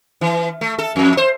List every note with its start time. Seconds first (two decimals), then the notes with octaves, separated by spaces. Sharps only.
0.21 E3
0.61 A3
0.78 A4
0.96 F2
1.17 C5